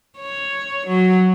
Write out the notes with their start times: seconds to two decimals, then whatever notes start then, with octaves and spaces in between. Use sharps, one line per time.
0.19 C#5
0.88 F#3